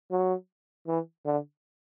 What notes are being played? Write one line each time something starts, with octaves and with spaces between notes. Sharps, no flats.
F#3
E3
D3